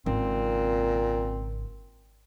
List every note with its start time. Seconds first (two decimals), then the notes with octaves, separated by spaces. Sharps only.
0.06 G#1 A#2 C#3 C4